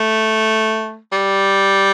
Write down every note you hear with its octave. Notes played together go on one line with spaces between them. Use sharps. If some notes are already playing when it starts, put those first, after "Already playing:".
Already playing: A3
G3